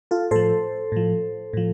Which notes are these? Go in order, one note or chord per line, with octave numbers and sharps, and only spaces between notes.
F4 A4
A2 F3 A4 C5
A2 F3
A2 F3